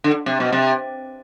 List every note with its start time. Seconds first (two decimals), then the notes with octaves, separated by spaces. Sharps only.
0.04 D3
0.26 C3
0.40 B2
0.52 C3